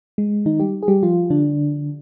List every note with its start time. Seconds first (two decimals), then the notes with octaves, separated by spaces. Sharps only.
0.18 G#3
0.46 D#3 D#4
0.60 G3 G4
0.83 G#4
0.88 G3 G4
1.03 F3 F4
1.30 D3 D4